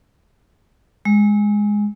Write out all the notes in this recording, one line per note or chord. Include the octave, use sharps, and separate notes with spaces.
G#3